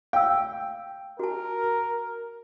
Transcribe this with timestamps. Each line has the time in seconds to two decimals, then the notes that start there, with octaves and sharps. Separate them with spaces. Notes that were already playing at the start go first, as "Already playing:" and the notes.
0.13 F5 G5 E6
1.19 F#4 A#4 A5